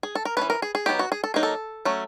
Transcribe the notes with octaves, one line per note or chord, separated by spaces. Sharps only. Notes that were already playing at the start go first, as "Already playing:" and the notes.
G#4
A4
A#4
E3 A3 C#4 B4
A#4
G#4
G#4
F#3 B3 D#4 G4
F#4
G#4
A4
F#3 A#3 D#4 G#4
A4
F#3 A3 C#4